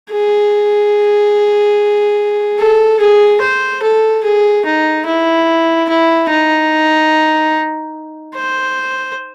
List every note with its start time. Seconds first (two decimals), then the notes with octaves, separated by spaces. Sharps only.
0.11 G#4
2.59 A4
3.00 G#4
3.41 C5
3.82 A4
4.23 G#4
4.65 D#4
5.06 E4
5.89 E4
6.29 D#4
8.35 C5